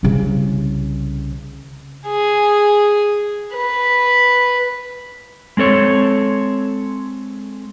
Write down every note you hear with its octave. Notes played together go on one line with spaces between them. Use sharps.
C2 C#3
G#4
B4
G#3 C4 A4 C#5